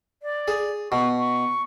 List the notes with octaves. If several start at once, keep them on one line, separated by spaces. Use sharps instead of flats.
D5
G#4
B2 C#6
C#6